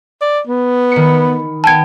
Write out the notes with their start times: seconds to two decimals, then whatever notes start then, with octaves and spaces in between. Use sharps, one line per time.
0.22 D5
0.47 B3
0.92 D#3 B5 C#7
1.64 B3 G5 A5 G#6 E7